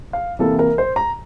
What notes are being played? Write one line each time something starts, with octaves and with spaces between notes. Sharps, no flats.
F5
C3 E3 A#3 E4 A4
A#4
C5
A#5